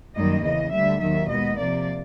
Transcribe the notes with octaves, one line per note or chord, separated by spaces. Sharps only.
F#2 D#3 G3 A#3 D#5
E2 C#3 E3 D#5
D2 D3 G3 E5
D#2 D#3 F#3 E5
B2 G#3 B3 D#5
C3 F3 A#3 D5